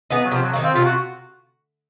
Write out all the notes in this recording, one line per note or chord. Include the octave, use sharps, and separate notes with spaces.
B3 D#4 G#4
F#3
C3 F3
F#3
D#3 G3 A#3
C4
C3 F4
F#4